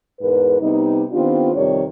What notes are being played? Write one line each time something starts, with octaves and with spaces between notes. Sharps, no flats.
E2 G#2 A#4 B4
C3 G3 B3 D#4
D#3 B3 C4 D4 F4 G4
F2 C3 D#3 G3 C#5 D5